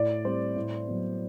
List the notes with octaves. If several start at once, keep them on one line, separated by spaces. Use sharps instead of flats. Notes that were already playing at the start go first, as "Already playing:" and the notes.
Already playing: A2 D5
G3 C4 C5
A2
F#3 B3